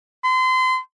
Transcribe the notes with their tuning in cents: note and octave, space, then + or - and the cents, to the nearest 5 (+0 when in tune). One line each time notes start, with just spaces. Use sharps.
C6 -30